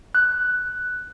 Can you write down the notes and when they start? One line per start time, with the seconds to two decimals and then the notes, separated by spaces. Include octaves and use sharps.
0.15 F#6